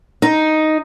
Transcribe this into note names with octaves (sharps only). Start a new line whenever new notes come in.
D#4